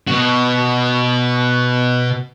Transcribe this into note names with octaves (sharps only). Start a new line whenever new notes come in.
B2 F#4